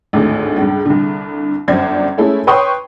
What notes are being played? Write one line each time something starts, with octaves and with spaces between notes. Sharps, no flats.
G#1 D2 A2
C#2 G2
C2 D3
G1 F#2 C5 D5 G#6
G#3 A3 C#4 E4 A4
B4 C#5 G5 C6 C#6 D#6